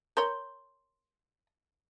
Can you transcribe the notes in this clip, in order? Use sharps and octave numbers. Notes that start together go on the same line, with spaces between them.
A#4 C#5 C6 G6